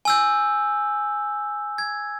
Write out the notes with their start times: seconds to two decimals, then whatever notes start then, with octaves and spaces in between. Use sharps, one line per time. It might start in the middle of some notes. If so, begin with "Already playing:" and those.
0.05 G#5 E6 G6
1.78 G#6